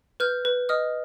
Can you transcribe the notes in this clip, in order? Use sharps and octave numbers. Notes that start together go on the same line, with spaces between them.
B4 F6 G6
B4
D#5 D#6 F6